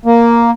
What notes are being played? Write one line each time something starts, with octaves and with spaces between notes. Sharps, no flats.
A#3